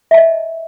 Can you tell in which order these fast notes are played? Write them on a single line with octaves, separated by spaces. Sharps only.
E5 A5 D#5